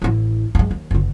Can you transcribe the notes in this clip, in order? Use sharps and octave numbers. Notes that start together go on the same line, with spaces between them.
A1 E4
G2 G#3
D#2
F#1 D3